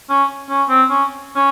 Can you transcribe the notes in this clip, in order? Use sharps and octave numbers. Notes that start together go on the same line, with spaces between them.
C#4
C#4
C4
C#4
C#4